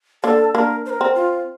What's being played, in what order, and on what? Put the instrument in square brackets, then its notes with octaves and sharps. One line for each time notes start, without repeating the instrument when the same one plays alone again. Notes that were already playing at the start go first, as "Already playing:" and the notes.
[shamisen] A#3 D4 [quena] A4
[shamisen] A#3 D4 [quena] A#4
[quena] C5
A#4
[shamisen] C4
[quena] F4